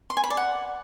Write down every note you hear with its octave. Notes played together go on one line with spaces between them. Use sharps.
C6
G#5
B5
D5
F#5